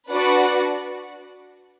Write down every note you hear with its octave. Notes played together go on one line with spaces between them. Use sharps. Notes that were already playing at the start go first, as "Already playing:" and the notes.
D4 F#4 B4 D5 F#5